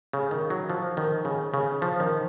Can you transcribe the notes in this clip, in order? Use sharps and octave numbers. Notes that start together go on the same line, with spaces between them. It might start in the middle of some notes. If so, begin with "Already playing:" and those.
C#3
D#3
F#3
F3
D#3
C#3
C#3
F3
D#3